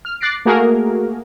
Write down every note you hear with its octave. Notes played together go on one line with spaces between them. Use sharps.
F6
D6 F#6 A6 A#6 C7 D7
A3 A#3 F#4 G#4 A#4